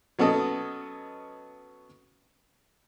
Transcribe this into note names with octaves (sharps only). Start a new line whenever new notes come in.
F#3 B3 C#4 A4 D#5